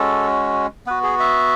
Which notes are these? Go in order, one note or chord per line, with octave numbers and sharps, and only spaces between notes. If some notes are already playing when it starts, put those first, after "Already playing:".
Already playing: G#3 C#4 F#4 A4
B3 F#4 B4
G#4
E5